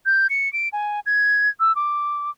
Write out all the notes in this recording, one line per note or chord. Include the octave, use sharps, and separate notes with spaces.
G6
C#7
D7
G#5
G#6
E6
D6